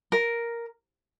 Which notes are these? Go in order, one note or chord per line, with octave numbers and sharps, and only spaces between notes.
A#4